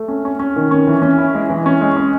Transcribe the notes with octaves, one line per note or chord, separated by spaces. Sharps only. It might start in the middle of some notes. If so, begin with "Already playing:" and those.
Already playing: A3
C#4
C#4
C#4
D#3
C#4
E3
C#4
E4
G#3
E3
C#4
G#3
C#4